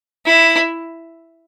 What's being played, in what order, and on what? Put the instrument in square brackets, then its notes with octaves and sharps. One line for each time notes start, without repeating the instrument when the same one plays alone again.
[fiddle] E4